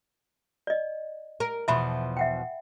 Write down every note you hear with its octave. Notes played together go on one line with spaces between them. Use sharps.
D5 D#5
A#4
E2 B2 F3 E5 B5
E5 F#5 G5